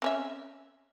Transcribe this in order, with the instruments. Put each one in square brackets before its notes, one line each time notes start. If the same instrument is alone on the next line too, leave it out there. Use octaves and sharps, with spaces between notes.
[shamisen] C4 C#4 E5